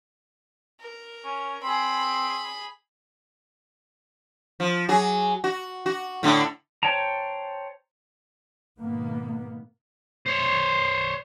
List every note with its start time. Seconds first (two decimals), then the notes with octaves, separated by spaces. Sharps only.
0.81 A#4
1.25 C#4
1.63 C4 G#4 B5
4.60 F3
4.89 F#3 G#4
5.44 F#4
5.86 F#4
6.23 A2 D3
6.83 C5 C#5 G5 A5 A#5
8.81 G#2 B2 D#3 A#3 B3
10.26 C5 C#5